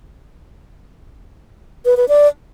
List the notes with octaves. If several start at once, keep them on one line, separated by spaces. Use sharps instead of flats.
B4
B4
D5